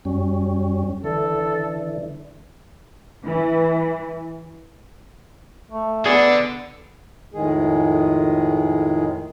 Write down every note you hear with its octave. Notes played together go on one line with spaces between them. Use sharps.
F#2 G3 C#4
D3 E3 A4
E3
A3
D3 B3 G#4 D5
F2 A2 D#3 G#3 G#4